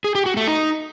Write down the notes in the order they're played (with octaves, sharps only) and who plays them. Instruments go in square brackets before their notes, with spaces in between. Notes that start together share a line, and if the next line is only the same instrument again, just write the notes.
[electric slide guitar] G#4
G4
F#4
A3
D#4